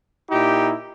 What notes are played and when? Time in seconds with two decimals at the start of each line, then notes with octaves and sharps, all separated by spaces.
0.30 A#2 D#4 E4 G4